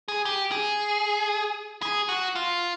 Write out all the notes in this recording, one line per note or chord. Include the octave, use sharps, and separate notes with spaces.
G#4
G4
G#4
G#4
F#4
F4